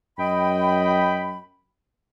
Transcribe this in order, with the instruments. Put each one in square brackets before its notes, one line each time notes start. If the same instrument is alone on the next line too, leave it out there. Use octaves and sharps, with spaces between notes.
[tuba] F#2 [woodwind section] D#5 G5 B5